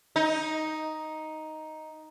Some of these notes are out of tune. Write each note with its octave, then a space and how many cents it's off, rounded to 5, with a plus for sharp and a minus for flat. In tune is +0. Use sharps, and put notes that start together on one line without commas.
D#4 +5